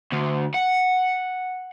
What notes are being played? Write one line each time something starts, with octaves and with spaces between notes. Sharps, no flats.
D2
F#5